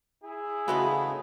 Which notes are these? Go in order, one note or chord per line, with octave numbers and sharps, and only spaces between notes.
E4 G#4
C#3 E3 G#3 A3 B3 F#4